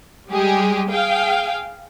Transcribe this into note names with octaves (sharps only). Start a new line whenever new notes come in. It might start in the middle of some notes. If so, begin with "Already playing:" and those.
G3 G#3 G4 G#4
G#4 F5 G5